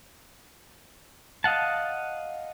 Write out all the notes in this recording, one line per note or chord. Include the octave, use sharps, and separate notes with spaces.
D#5 F5 F#5 A5